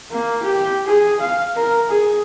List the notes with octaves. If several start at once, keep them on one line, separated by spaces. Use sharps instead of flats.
A#3
G4
G#4
F5
A#4
G#4